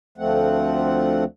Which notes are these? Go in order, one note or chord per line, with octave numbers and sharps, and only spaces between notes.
D2 F3 A3 C4 F#5